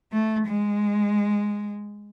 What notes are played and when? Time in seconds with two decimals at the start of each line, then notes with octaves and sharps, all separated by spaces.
0.13 A3
0.47 G#3